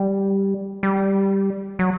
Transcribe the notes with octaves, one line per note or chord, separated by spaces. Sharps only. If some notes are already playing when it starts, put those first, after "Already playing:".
Already playing: G3
G3
F#3